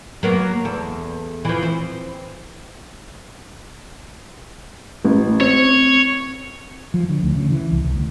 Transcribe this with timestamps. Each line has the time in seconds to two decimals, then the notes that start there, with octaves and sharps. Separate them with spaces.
0.23 F#3 A#3 B3
0.65 E2 A4
1.45 E3 F3
1.62 C4
5.05 A1
5.40 C4 C#5
6.94 F3
7.09 D3
7.23 D2
7.35 C#3
7.50 E3
7.71 C2
7.84 C2
7.96 D2